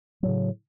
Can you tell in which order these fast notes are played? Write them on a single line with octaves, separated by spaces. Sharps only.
F#3 A2 C#3